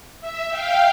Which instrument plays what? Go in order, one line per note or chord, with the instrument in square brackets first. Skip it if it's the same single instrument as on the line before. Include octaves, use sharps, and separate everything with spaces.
[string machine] E5
F5 G5